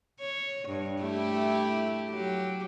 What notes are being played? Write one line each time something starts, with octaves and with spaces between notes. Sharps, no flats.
C#5
G2
A3 E4 G4
F#3 G4